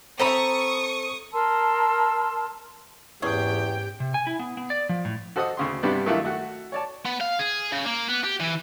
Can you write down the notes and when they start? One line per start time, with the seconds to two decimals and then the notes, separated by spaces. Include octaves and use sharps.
0.19 C4 A4 A#5 B5 C#6 D#6
1.33 A#4 A5 C6 E6
3.22 E2 G#2 C#4 G4 G#4 G5
4.00 C3
4.14 G#5
4.27 E4
4.39 B3
4.57 B3
4.70 D5
4.89 F3
5.05 A2
5.36 F#4 A4 C5 D#5 F#5 D#6
5.57 D2 C#3 C6
5.83 G2 C3 G3 B3 D4
6.06 D#3 F#3 A3 D4 E4 F4
6.24 A3 F#4 F#5
6.72 C#5 D5 A5
7.05 B3
7.21 F5
7.39 G#4
7.72 C#3
7.86 A#3
8.09 B3
8.24 G4
8.41 E3